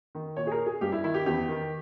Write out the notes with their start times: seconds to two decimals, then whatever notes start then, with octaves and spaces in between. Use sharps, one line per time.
0.15 D#3
0.36 A#2 C#5
0.47 G#4
0.51 A#4
0.66 G#4
0.81 G2 G4
0.92 E4
1.04 D#3 E4
1.14 G4
1.26 E2 G4
1.49 D#3